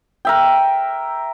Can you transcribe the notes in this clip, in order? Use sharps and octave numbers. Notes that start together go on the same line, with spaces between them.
A#4 E5 G5